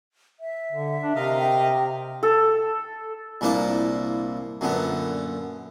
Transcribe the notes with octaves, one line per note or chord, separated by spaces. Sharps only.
E5
D3
D4
C3 A#4 D#5 F5
G5
A4
C2 A#2 A#3 D4 E4 D6
F#2 A#2 D3 B3